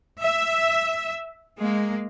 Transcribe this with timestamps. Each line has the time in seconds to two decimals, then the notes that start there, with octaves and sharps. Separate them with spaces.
0.22 E5
1.59 G#3 A#3